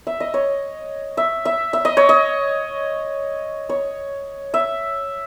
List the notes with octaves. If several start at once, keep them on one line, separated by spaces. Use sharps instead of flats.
E5
D#5
C#5
E5
E5
E5
D#5
C#5
D#5
C#5
E5